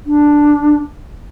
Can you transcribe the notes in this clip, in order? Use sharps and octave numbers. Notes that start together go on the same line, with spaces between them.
D4